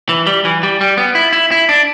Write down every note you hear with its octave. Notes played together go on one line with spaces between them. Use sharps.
E3
G3
E3
G3
G3
B3
E4
E4
E4
D4